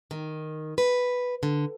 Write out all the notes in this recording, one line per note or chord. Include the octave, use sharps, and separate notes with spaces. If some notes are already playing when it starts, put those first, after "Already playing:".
D#3
B4
D3